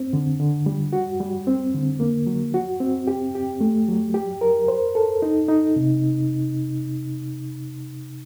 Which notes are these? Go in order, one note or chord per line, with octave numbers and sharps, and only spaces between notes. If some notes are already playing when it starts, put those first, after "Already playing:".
Already playing: C4
D3
D3
G3
F#4
G3
C4
D3
A#3
F#3
F#4
C4
G4
G4
A3
F#3
G4
A#4
C5
A4
D#4
D#4
C3